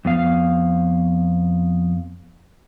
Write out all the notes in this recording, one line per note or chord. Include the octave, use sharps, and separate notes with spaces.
F2 B3 F5